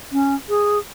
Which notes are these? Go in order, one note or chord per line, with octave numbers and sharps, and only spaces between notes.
C#4
G#4